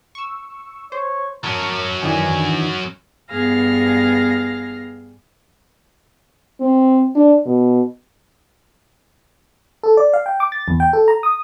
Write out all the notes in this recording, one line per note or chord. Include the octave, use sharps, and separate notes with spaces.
C#6 E6
C5 C#5
F#3 C#4 A#4 A5
D#3 E3 D4 G#5
G2 B3 G#4 F5 F6 A#6
C4
D4
B2
A4
D5
F5
G5
D6
A6
E2
G5
A4
A#5
D#6